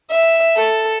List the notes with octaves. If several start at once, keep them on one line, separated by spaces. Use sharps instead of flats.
E5
A4